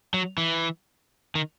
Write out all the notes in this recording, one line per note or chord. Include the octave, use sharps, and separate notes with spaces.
F#3
E3
D#3